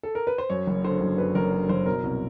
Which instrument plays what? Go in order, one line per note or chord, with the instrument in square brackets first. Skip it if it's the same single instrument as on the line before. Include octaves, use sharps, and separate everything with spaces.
[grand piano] A4
A#4
B4
C5
F#2 C#5
F#1
D3 C5
F#1
F#2 B4
F#1 A#4
D3
F#1 C5
B2 A#4
C2